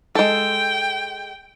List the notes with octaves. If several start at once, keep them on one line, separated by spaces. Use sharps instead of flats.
G#3 A4 G5